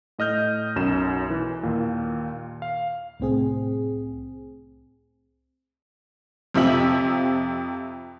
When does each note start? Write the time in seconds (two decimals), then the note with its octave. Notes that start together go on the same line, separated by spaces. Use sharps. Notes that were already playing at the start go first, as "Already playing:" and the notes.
0.19 A2 D#5 F6 G6
0.76 B1 F#2 E7
1.30 E3
1.63 D#2 A#2
2.62 F5
3.20 C2 A2 C4 G#4
6.54 F2 C3 F3 E5 F#7